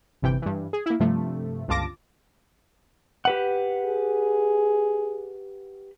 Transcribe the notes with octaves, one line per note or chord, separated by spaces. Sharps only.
G1 C3 E3 G5
G2 E3
G#4
A#3 E4
G2 C3 F3 A3
G1 C#2 F4 A5 D6 A#6
G4 B4 F#5
G#4